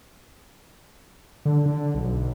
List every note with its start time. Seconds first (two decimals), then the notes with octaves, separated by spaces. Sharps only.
1.45 D3
1.66 D3
1.95 B1